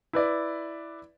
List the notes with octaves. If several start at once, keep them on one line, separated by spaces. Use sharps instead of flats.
E4 B4 D5